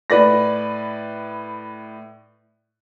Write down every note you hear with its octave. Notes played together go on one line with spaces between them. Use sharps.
A2 B4 D5 A#6